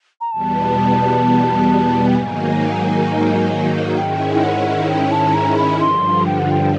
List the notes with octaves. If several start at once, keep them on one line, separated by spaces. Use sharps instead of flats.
A#5
E2 B2 G3 B3 A5
G5
G#2 D#3 F#3 A#3 D#4 G#5
G#2 D#3 G#3 C#4 E4 G5
G5
F#5
G5
A5
A#5
B5
G2 D3 F3 C6
G5
F#5
G5